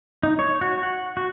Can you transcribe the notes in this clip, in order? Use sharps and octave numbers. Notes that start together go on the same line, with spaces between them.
D#4
C#5
F#4
F#5
F#4